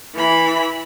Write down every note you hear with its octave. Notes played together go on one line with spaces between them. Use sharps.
E3 B5